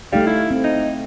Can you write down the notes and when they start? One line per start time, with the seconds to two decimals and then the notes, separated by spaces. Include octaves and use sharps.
0.13 G3 A3 D#4 F5
0.27 E4
0.51 C4
0.64 D#4